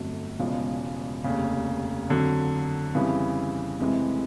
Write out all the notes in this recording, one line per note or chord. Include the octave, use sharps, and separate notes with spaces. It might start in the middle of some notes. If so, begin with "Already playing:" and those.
Already playing: G1 F2 D3 F#3 A3
E1 E2 C#3 F3 G#3
F1 D#2 C#3
F2 D3 F#3
F2 C#3 E3 G3 B3
F1 F2 C3 E3 G#3